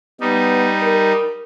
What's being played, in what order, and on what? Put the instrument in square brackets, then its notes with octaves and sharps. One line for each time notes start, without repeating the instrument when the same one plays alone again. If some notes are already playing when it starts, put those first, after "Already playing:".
[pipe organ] G3 D#4 [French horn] B3
[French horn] A#4